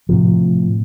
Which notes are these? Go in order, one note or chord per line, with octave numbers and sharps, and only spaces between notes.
A2 C3 F3